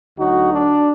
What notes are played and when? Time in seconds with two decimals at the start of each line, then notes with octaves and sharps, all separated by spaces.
0.17 D2 D3 F#3 D#4 F#4
0.51 D4